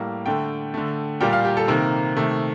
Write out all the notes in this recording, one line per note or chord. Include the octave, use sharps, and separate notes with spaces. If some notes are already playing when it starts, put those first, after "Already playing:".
Already playing: A2 G3 A#3
D3 A3 G5
D3 A3
A#2 G3 A#3 G5
F5
G4
A4
C3 D#3 A#3 A#4
C3 D#3 A3